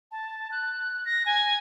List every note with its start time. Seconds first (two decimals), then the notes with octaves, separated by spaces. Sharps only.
0.12 A5
0.51 F#6
1.05 A#6
1.26 G#5